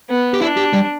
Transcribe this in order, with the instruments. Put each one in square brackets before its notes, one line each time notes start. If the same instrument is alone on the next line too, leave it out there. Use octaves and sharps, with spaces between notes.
[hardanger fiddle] B3
[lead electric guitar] G4
[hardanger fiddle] D4 [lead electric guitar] E4
[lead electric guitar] G4
G3